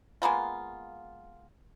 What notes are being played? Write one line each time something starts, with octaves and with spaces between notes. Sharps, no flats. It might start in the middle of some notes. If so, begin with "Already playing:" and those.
G#3 A#3 B3 F4